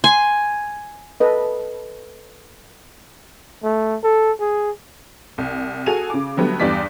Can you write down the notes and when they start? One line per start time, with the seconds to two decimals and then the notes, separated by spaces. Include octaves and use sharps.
0.04 G#5 C6
1.20 A4 B4 D#5
3.64 A3
4.04 A4
4.40 G#4
5.38 C2
5.86 F#4 G#4 A4 G#5 D#7 F7
6.10 C#3 D6
6.37 D3 F#3 G3 A3 B3
6.60 E2 G2 G3 D5 D6 B6